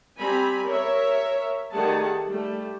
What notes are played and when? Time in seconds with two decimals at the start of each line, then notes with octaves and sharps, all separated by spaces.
0.19 G3 C4 G#5 A#5 B5
0.65 A#4 C#5 E5
1.71 D#3 G3 A3 G#4 F#5 A5
2.26 G3 A3